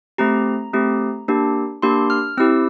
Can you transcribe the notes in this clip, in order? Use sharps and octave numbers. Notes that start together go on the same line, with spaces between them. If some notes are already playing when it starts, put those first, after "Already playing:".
A3 C4 G4 A#5
A3 C4 G4
A#3 D4 G4
A#3 D4 G4 C6
F6
C4 E4 G4 E6